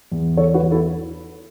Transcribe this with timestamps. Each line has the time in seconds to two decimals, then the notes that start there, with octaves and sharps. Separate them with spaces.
0.12 E2
0.37 E3 A4 C#5
0.54 F#4 B4
0.62 E2
0.71 E4 A4